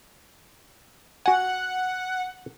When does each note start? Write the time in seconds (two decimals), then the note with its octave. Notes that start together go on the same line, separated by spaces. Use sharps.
1.26 F#4 F#5 G#5